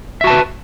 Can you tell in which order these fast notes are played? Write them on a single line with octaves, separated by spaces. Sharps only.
E5 F#4 A5 B4